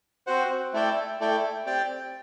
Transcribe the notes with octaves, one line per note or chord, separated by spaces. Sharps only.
C4 F#4 C5 F#5
A3 E4 A4 D5 G5
A3 E4 A4 D5 G5
C4 G4 D5 G5